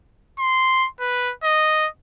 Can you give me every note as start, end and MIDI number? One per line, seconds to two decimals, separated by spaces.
0.39 0.87 84
1.00 1.33 71
1.43 1.88 75